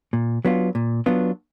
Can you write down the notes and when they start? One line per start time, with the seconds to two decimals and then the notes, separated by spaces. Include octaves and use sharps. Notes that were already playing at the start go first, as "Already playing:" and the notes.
0.13 A#2
0.45 F#3 B3 D4 F4
0.75 A#2
1.06 F#3 B3 D4 F4